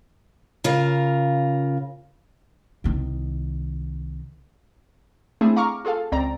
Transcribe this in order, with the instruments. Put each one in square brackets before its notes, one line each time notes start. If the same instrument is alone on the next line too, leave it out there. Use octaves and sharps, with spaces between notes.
[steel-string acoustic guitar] C#3 F4 A#4 F5
[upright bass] C2 D#3
[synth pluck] A3 C4 D4 E4 G#4
F5 A#5 C#6 D6 F6
F4 G#4 A4 F5
C#2 C4 D5 A#5